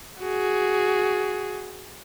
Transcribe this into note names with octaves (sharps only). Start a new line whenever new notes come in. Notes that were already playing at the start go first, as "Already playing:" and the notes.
F#4 G#4